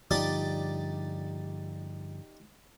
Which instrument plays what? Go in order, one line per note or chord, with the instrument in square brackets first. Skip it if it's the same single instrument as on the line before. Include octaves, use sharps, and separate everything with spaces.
[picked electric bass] G2 D3 F3 [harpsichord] D#4 G4 D5